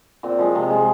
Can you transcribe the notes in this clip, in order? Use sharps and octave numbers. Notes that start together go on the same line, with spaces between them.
A#2 C4
F3 G#3
C3
F3 G#3